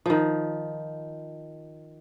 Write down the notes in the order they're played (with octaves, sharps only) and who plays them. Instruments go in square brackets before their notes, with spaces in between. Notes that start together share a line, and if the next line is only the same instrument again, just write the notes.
[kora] D#3 F3